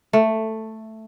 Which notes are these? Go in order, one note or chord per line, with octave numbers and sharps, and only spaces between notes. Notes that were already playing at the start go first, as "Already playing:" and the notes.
A3